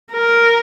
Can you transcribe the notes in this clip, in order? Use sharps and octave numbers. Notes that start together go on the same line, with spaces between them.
A#4